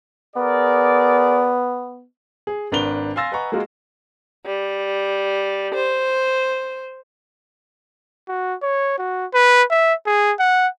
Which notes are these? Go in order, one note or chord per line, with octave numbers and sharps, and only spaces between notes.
B3 G#4 A#4 D5
G#4
G#1 D4 A#4 B4 F7 G7
F5 G#5 C6 E6 A6 A#6
B4 D#5 F#5 G#5 A#5 C#6
G#3 A#3 F4 F#4 G#4 A#4
G3
C5
F#4
C#5
F#4
B4
E5
G#4
F#5